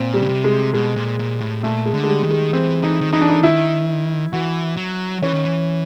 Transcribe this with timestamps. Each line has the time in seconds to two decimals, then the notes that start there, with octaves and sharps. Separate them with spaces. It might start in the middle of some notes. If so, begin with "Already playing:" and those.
Already playing: A#2 C4
0.14 G3
0.21 C#3
0.29 C3
0.44 G#3
0.74 B2 G#3
0.96 A#2
1.19 A#2
1.41 A2
1.63 A#2 A3
1.86 G#3
1.94 D3
2.04 G#3
2.08 G3
2.23 D#3
2.30 G#3
2.53 E3 C4
2.83 E3 D#4
3.01 D#3
3.12 E3 D#4
3.21 D4
3.29 D#4
3.43 D#3 E4
4.33 E3 F#4
4.77 F#3
5.22 E3 C#4
5.34 D#3
5.45 E3